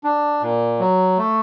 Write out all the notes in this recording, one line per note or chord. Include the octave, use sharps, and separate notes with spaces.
D4
A#2
F#3
A3